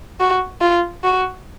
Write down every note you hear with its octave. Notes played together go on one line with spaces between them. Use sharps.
F#4
F4
F#4